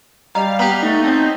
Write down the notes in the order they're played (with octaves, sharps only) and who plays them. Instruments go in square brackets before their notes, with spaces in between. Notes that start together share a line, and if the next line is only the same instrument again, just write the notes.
[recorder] G3 [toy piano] D5 D#5 A#5 [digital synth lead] F5
[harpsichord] B3 G4 [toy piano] A#5
[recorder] A3 [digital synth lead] D#4
[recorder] C4 [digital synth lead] D#4 [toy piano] C#5 A5